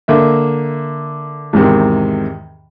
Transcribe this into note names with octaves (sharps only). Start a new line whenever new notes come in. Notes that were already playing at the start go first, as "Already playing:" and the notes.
D3 A#3 E5
E2 G#2 C3 D#3